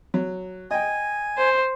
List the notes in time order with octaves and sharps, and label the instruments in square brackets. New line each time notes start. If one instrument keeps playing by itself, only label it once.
[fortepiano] F#3
[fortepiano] D#5 G5 [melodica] G#5
[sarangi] C5